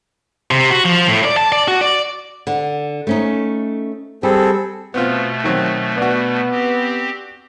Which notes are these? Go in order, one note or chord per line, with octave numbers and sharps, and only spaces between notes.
C3
F#4
F3
A2
D5
A5
D5
F#4
D5
D3
A3 C#4 D#4
G3 C4 G#4 A4
B2 A3 B3 C4 F4
D#3 F#3 C4
B3 D4 F#4
C4 G4